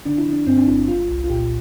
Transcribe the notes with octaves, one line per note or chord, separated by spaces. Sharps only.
D3 D4
E4
F3
D4
G2 C4
D4
G1 E4
G3 F4
C2
F4
A#2 G4